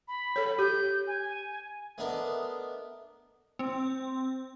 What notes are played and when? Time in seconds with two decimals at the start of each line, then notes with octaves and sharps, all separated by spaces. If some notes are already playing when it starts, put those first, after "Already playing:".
0.08 B5
0.36 A4 C#5
0.59 G4 G6
1.07 G#5
1.98 A3 B3 D4 A#4 D#5
3.59 C4